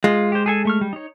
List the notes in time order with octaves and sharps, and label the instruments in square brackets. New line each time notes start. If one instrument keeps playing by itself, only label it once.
[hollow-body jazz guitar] G#3 [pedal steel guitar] F4
[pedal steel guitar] G4 C5
G#4 A4 G#5
A3 C#6 F6
G3
D#4 C#5